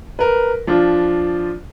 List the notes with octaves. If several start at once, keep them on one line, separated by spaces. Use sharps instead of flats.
A#4 B4
F3 D4 F4